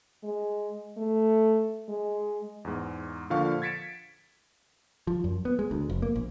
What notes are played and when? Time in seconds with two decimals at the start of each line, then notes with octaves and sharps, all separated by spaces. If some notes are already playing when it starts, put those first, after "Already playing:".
0.23 G#3
0.97 A3
1.89 G#3
2.65 E2 G#2
3.30 A#2 D3 F3 F5 F#5 C#6
3.62 G#6 A6 B6 C#7 D7 E7
5.07 F3
5.24 F#2
5.45 B3
5.59 G#3
5.71 D2
5.90 F1
6.02 A#3
6.15 A#1